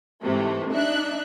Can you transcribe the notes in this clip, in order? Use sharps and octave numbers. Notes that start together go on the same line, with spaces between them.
G#2 C3 E3 A3
D4 D#4 E5 F#6